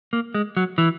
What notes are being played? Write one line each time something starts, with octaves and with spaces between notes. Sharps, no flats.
A#3
G#3
F#3
E3